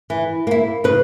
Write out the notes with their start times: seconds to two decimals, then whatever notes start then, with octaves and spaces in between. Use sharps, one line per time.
0.10 E3
0.47 A#3 E4
0.84 C#3 B4